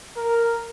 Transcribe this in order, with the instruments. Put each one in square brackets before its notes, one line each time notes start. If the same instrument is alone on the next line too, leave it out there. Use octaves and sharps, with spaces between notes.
[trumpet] A#4